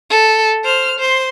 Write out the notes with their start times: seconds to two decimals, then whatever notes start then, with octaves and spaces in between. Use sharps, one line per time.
0.10 A4
0.64 C5 F6
0.99 C5 C6